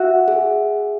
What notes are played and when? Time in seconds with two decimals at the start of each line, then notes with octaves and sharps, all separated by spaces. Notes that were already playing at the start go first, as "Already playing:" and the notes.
Already playing: F#4 E5
0.28 G#4